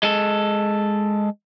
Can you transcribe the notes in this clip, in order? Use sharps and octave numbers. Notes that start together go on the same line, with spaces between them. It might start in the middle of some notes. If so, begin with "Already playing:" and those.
G#3 A4